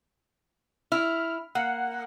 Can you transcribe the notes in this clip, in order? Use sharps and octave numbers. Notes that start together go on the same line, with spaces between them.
E4 F6
A#3 F#5